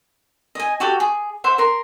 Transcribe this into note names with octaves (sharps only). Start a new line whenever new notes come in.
D#5 G#5
F#4 G4 A4
G#4
C5 E5 F#5
A#4 C6